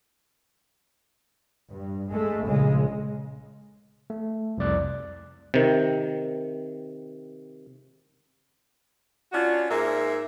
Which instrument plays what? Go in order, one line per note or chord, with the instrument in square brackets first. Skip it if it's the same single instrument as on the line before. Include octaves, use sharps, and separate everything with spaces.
[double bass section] G2
G#3 A3
A#1 C#3 G#3
[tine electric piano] A3
C2 F2 D5 F#6
[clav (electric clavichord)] C3 D#3
[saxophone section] C#4 D4 F4 F#4
G#2 A#3 E5